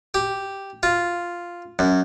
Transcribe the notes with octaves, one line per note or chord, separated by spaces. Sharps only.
G4
F4
F#2